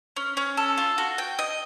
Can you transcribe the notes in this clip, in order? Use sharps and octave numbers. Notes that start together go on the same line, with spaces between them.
C#4
C#4
A4
F4
F#4
G5
D#5